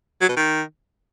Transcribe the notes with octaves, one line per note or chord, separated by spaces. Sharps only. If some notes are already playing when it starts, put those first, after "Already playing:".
F#3
B2
D#3